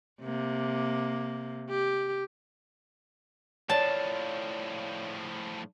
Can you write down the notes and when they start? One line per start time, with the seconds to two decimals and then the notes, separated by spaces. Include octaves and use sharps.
0.21 C3 A#3
1.70 G4
3.70 A2 F3 C#5 D5 A5